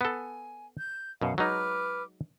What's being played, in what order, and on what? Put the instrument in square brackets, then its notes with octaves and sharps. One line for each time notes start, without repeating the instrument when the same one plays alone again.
[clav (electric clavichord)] B3 A4 [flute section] G#5
[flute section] G6
[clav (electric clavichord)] F#2 B2 [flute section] F5 F#5
[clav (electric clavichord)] F#3 G#3 D#4 [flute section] B4 D6 F6